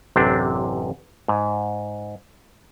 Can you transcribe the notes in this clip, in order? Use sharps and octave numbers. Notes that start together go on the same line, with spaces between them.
A1 F#2 C3 C4 D4
G#2